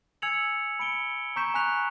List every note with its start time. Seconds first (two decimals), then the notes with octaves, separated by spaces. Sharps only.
0.22 G#5 E6 G#6 C#7 F7 F#7
0.79 B5 C#7 D7 G7
1.36 A#5 C#6 G6 B6 E7
1.54 G#5 A#5 C#6 F#6 B6 F7